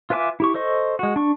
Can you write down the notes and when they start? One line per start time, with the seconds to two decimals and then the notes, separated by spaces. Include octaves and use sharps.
0.10 F4 B4 E5 G#5 D6
0.40 E4 G4 C#6
0.54 A4 C5 D#5 C#6
0.99 G#3 F#4
1.16 D4 C#6